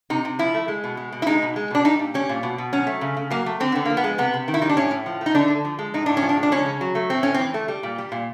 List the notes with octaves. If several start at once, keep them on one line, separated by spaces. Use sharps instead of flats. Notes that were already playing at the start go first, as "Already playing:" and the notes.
C3 D#4
C3
F3 E4
A3
G#3
B2
G#3
B2
E4
G#3 D#4
B2
G#3
B2 D4
G3 D#4
A#2
G3 C#4
A#2
B2
B2
F#3 C#4
A3
C#3
C#3
F#3 A#3
A3
D3 C4
D3 B3
F3 A#3
B3
G#3
C3 B3
C3
D#3
E4
G3 D#4
D4
A2 C#4
A2
F3
A3
D#4
D3 D4
D3
F3
G#3
A2 D#4
A2 D4
C#4
F3
D4
G#3
D4
C#3 C#4
C#3
F#3
A3
A2 C4
A2 C#4
E3 C4
A3
G3
A#2
G3
A#2